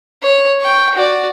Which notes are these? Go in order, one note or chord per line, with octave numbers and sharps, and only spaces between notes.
C#5
G5 C#6
F#4 D5